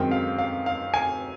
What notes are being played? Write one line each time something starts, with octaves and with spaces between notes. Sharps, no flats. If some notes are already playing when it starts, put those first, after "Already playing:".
Already playing: F#2 D#3 G#3 C4 G5
F5
F5
F5
G#5